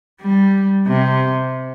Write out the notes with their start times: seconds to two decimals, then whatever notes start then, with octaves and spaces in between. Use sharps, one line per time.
0.22 G3
0.87 C3